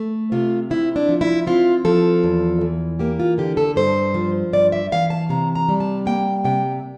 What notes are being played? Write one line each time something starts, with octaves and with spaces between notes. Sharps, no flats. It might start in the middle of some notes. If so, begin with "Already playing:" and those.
Already playing: A3
C3 F4
C4 E4
D4
F3
E4
C4 F4
F3 A4
E2
E3
A#3 G4
F4
D3 G4
A4
G2 C5
F3
G2 D5
E5
E3 F5
A5
C3 A#5
A#5
G3
A5
A#3 G5
C3 G5